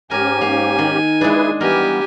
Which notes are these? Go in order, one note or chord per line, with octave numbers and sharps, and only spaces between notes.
G#2 C#4 G4 A#4 G#5
A#3
D#3
G#3 D4 E4 G#4 B4
E3 G3 B3 G4 A#4 G#5